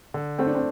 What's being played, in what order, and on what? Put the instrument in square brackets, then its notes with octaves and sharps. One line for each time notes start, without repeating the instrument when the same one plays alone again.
[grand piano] D3
[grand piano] A3 [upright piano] C4
[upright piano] D4
C4